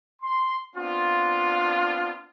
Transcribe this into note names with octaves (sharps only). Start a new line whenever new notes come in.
C6
B3 C4 D4 F4